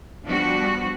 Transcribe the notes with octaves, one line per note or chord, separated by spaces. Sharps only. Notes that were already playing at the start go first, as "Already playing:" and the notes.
F3 G3 B3 D4 F#4